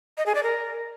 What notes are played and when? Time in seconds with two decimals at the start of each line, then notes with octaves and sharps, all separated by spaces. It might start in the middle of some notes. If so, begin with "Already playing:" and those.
0.18 D#5
0.26 G#4
0.35 D5
0.43 A#4